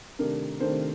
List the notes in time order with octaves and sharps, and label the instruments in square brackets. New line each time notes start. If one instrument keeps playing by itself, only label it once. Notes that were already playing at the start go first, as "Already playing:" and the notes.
[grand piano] C3 D#3 A3 D4 A#4
C3 D#3 A3 D4 C5